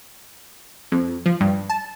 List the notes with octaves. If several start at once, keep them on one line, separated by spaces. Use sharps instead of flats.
F2
F3
G2
A5